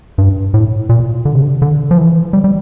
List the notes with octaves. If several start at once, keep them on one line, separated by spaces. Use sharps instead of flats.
G2
A2
A#2
D3
C3
D3
D3
F3
E3
G3
G3